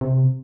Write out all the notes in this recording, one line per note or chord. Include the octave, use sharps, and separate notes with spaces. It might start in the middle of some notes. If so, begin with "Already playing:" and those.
C3